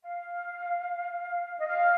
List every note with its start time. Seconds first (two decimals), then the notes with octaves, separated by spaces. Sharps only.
0.03 F5
1.59 D#5
1.67 F5